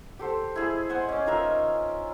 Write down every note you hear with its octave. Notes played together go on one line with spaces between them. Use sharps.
G4 A4 C5
E4 G#4 E5
C5 D#5 F#5 G#5
C#4 D6
D#4 F4 A#4 E5